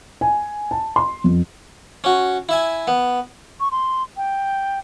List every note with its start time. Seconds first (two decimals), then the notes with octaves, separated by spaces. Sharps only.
0.21 G#5
0.71 A5
0.96 C6
1.24 F2
2.04 C#4 F#4
2.49 E4 E5 G#5
2.87 B3
3.60 C#6
3.71 C6
4.17 G5